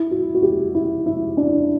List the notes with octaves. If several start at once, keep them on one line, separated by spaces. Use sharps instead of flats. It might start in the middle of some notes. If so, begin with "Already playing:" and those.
Already playing: E4
F#4
F#4
G4
E4
E4
D4